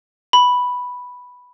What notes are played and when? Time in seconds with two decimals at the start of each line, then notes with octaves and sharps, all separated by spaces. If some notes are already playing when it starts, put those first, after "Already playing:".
0.33 B5